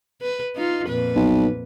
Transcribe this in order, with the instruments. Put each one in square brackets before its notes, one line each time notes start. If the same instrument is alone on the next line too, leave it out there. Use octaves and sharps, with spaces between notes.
[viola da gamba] B4
D#4 F4
F2 A#2 B4
[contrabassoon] B1